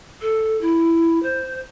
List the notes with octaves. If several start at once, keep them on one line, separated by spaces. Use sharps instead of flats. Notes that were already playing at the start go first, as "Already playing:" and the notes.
A4
E4
C5